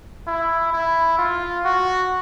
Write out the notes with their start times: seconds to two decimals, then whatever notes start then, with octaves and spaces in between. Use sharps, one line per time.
0.27 E4
0.73 E4
1.18 F4
1.65 F#4